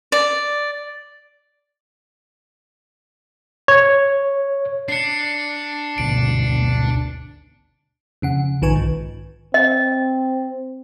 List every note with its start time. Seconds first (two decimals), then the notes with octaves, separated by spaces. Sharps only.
0.12 D5
3.68 C#5
4.88 D4 C7 C#7
5.98 G#1 D2 B2 D7
8.22 F2 C#3 F#5
8.62 A#1 G#2 D#3 B4 G#5 C#6
8.76 A#1 G#2
9.54 C4 D#5